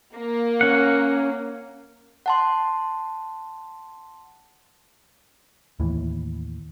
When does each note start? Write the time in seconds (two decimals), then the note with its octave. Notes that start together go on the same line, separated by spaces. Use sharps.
0.16 A#3
0.61 C#4 F#5
2.26 F#5 A5 C6
5.80 D#2 A2 E3